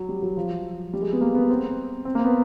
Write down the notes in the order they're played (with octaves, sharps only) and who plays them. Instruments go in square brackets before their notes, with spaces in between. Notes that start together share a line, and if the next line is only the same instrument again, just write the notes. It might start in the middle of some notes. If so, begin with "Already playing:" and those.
Already playing: [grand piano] F#3
G3
F#3
F3
G3
G#3
B3
A#3
B3
C4
C4
A#3
C4
B3